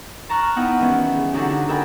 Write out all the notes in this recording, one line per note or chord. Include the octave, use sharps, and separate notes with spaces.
A5 A#5 C#6 F6 F#6
B3 D#4 E4 D#5 F#5 G5
D#3 E3 G3 B3 C#4
C#3
D3 F#3 D4 D#4 F#4 G4
A4 A#4 D#5 G5 G#5 B5